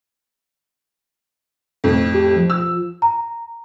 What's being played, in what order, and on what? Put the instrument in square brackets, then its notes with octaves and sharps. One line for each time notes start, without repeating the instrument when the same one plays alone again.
[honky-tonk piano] F2 A2
[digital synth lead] G4
F3
[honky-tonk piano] E6
[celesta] A#5